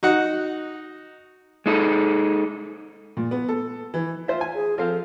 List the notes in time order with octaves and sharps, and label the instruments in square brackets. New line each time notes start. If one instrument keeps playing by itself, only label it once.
[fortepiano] D#4 F#4 F#5
[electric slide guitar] G#3 D#4 A4
[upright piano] A#2
B3
A4
E3
[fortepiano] F4 C5 E5
G#5
[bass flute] G#4
[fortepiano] F3 C4 F5 [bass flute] A4